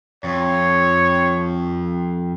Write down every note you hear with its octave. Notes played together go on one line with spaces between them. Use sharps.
F2 C#5